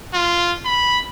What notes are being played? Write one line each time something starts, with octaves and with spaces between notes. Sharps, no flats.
F4
B5